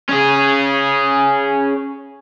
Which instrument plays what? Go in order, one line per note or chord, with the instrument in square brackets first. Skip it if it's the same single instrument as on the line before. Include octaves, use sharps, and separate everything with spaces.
[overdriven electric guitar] C#4 G#4